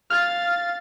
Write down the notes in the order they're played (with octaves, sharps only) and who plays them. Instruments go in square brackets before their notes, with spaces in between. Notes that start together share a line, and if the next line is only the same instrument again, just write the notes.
[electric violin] F5 A6 [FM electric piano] F6